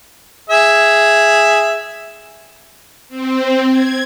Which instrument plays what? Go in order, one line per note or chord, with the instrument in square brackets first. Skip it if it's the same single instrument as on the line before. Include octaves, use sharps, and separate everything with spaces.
[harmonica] G#4 E5
[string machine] C4
G#6